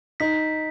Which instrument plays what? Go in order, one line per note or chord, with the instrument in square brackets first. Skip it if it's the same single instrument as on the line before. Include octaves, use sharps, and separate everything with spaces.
[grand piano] D#4 [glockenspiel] B6